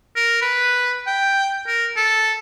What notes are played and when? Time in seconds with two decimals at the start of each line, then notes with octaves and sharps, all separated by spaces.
0.16 A#4
0.42 B4
1.06 G5
1.67 A#4
1.96 A4